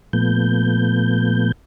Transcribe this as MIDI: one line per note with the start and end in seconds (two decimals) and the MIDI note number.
0.13 1.52 46
0.13 1.52 53
0.13 1.52 57
0.13 1.52 59
0.13 1.52 91